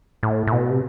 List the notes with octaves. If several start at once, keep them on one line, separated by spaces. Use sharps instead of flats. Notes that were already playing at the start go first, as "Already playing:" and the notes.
A2
A2
B2
C3